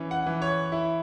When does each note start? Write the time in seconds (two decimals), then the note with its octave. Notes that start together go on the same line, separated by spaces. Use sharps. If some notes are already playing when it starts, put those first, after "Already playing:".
Already playing: E3 C#4
0.11 F#5
0.26 E3
0.42 C#5
0.72 E4